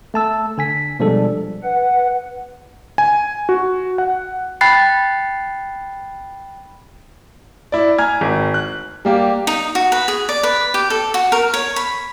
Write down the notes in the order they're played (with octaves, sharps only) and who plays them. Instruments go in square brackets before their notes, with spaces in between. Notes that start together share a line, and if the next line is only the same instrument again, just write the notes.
[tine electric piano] A3 A5 E6
D3 G#5 B6
B2 F3 G3 G#3 D4 A4
[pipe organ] B4 F#5
[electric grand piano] G#5
F#4
F#5
[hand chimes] G5 B5 F#6 A6 C7
[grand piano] E4 D5
G#5 A#5 F6 G#6
G#1
F#6
G3 A#3 G4
[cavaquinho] D#4
F#4
B4
G#4
D5
B4
G4
A4
F#4
A#4
C#5
B5